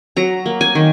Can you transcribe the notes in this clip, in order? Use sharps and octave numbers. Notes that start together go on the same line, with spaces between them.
F#3 A#5
A#3
G#5
D#3